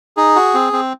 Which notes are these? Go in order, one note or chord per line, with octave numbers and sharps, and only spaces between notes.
D#4 G#4
F#4
C4
C4